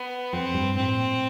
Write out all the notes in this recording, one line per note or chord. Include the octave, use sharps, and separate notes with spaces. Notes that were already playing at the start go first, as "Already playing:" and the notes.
Already playing: B3
F2 C4
G2
A2 C4
A#2